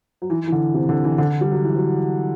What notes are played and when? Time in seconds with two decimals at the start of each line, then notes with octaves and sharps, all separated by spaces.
0.22 F#3
0.30 E3
0.48 E3
0.52 D3
0.74 C3
0.89 D3
1.04 E3
1.18 D3
1.41 G3
1.52 F#3
1.63 E3
1.75 F#3